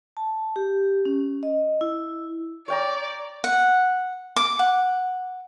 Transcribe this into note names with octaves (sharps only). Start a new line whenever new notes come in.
A5
G4
C#4
D#5
E4
C#5 D5 G5 A#5
F#5
D6
F#5